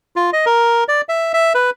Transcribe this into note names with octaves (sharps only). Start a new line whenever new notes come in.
F4
D#5
A#4
D5
E5
E5
B4